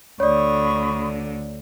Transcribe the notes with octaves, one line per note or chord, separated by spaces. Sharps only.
D2 D3 C#5 D5 B5 C#6 D#6